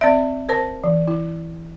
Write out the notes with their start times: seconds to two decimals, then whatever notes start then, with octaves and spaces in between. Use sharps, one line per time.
0.01 C4 D5 E5
0.49 A#4 C5 A5
0.84 E3
1.08 E4